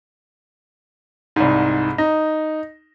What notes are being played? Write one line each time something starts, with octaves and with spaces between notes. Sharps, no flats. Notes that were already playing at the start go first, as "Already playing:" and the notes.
C2 G#2
D#4